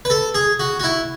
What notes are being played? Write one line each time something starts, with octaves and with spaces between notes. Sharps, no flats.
B4
A4
G#4
F#4
F#4
E4